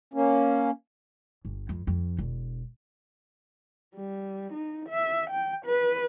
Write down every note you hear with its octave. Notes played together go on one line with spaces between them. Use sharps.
A#3 C#4
G1
F2
F2
E1
G3
D#4
E5
G5
B4